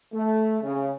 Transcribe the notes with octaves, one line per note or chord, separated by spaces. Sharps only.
A3
C#3